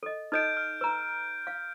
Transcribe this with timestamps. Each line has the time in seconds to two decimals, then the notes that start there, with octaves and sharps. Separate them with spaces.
0.03 A4 D#5
0.32 D#4 A4 D#5 F6 G6 D7
0.57 F6
0.81 B4 A#5
1.47 F5